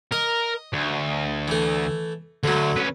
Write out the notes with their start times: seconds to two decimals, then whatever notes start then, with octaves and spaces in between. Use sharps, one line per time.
0.12 A#4 D#5
0.73 D2
1.48 E3 A3
2.44 D2 D3 F#3
2.76 C#4 B4